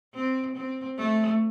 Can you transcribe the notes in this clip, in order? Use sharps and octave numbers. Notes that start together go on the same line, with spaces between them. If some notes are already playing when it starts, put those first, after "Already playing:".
C4
C4
A3